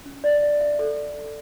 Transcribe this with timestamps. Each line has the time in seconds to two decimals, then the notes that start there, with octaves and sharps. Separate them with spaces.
0.06 C#4
0.24 D5
0.43 E5
0.61 E5
0.79 A4